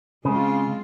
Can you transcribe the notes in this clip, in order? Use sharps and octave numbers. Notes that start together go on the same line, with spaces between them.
C#3 G#3 C4 F4